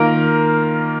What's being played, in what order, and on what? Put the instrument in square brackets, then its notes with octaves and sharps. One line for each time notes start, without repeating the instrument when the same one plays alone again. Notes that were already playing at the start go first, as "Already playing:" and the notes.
Already playing: [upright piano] D#3 A#3 F4 [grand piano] A#4